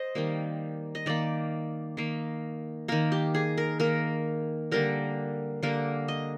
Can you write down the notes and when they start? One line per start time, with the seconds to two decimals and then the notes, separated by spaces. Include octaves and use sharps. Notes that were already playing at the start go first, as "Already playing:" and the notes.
Already playing: C5 D#5
0.15 D#3 G3 A#3
0.95 D#5
1.06 D#3 A#3 D5
1.97 D#3 A#3
2.88 D#3 A#3 A#4
3.12 G4
3.35 G#4
3.58 A#4
3.80 D#3 A#3 A#4
4.71 D3 G3 A#3 A#4
5.63 D3 G3 A#3 A#4
6.08 D#5